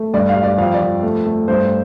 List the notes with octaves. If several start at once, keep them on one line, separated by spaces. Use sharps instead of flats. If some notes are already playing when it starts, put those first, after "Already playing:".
Already playing: A3
G2 D5
F5
G3
D5
F2 F5
D5
F2
A3
A3
G2 C5